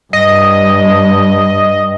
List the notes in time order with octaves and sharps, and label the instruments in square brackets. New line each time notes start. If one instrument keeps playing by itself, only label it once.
[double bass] G2 [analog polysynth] D#5